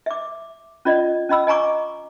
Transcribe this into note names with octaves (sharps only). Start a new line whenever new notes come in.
E5 D6
C#4 F4 D5 D#5
C#4 D#5 B5 E6
D#5 G#5 A#5 C#6 D6